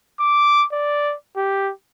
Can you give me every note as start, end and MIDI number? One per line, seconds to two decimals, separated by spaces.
0.19 0.65 86
0.72 1.14 74
1.36 1.71 67